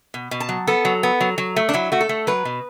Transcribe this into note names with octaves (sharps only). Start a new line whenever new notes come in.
B2
B2
A5
F#3
B3 A4
F#3
B3
F#3
F#3
A3
D4
F#3 E4
A3 F#4
A4
A3
F#3 B4
B2